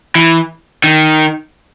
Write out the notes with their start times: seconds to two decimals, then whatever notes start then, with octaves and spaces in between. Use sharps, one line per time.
0.15 E3
0.84 D#3